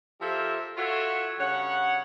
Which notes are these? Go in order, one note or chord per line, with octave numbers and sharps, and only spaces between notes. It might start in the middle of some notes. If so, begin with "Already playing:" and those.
F3 G4 A4 A#4 C5 E5
F4 F#4 A4 C#5 E5 F#5
G2 C#3 C#5 F#5